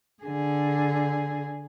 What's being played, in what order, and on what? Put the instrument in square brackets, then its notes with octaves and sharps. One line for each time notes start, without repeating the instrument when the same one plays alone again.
[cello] D3 G#4